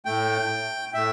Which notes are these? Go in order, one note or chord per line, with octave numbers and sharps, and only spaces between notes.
A2 A3 G5
A2 A3 E5